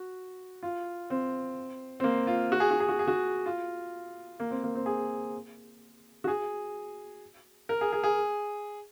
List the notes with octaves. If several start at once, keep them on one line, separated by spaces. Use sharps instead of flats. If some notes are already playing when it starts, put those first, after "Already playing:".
Already playing: F#4
F4
C4
C4
A#3
F4
F#4
G#4
F#4
G#4
F#4
G#4
F#4
F4
A#3
C4
A#3
C4
G#4
F#4
G#4
A#4
G#4
G#4
G#4